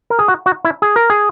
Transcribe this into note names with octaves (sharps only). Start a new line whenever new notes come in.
A#4
G#4
F#4
F#4
E4
G#4
A#4
G#4